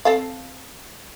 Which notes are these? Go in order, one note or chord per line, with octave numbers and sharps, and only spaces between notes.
C4 A4 F5